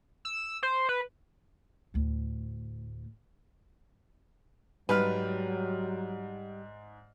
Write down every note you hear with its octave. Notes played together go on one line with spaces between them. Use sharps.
E6
C5
B4
D2 A2
G#2 F#3 G3 B4 F6